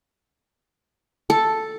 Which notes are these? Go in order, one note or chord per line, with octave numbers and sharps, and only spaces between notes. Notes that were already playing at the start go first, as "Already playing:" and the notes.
A4